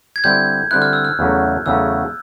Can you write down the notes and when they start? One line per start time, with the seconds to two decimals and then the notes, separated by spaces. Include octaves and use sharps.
0.16 G#6
0.24 D3 G3 C4 E4 G6
0.71 D3 G3 C4 E4 F#6
0.82 F6
0.93 E6
1.05 F6
1.19 E2 C#3 F#3 A3 C#4
1.66 E2 C#3 F#3 A3 C#4 E6